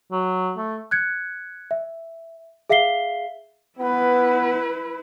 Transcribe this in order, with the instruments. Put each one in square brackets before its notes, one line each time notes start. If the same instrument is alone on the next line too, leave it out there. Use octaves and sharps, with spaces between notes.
[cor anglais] F#3
A3
[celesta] F#6 G#6 C#7
E5
G#4 E5 F5 B6 C7 G7
[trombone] B3 [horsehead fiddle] E4 B4